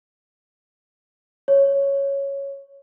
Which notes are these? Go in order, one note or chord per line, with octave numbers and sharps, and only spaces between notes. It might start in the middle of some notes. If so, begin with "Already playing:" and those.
C#5